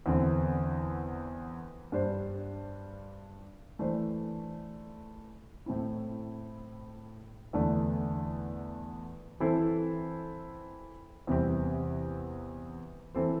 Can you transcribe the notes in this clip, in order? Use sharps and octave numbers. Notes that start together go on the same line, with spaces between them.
E2 D3 C4
G2 G3 D4 C5
E3 A3 D4 C5
A2 A3 C4 E4
E2 D3 A3 D4
E3 C4 E4 A4 C5
E2 C3 G3 C4 G4
E3 C4 A4 C5